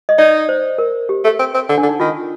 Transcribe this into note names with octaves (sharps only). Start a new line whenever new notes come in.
D#5
D#4 D5
C5
A#4
G4
A3
C4
C4
D3
D4
D3
D#4
D#3 F4